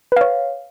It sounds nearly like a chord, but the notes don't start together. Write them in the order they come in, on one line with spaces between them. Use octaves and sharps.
B4 F5 C#5